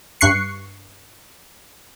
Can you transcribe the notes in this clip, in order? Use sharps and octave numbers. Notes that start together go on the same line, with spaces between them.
G2 C#6 F#6 C7 C#7